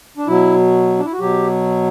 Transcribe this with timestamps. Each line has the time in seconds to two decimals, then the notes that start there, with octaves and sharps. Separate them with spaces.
0.17 D4
0.27 B2 F#3 E4
0.99 D4
1.05 E4
1.13 F#4
1.20 B2 F#3 G4